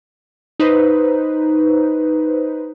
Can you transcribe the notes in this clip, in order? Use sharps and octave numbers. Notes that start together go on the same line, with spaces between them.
D#4 B4 C5